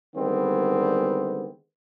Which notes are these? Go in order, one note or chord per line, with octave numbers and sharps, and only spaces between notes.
D3 D#3 G3 G#3 B3 C4